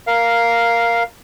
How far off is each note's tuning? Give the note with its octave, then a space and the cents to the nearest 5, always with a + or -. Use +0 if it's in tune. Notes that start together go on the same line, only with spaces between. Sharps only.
A#4 +0 F5 +0